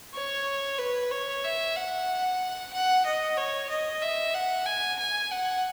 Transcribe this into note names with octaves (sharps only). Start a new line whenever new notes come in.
C#5
B4
C#5
E5
F#5
F#5
D#5
C#5
D#5
E5
F#5
G#5
G#5
F#5